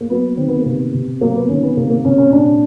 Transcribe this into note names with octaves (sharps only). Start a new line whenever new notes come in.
A#3
F#3 B3
D#3 C4
B3
A#3
C3 B3
C3
F#3 A#3
B3
D#3 C#4
B3
C3 A#3
A#3
C3 C#4
C#4
A#2 D4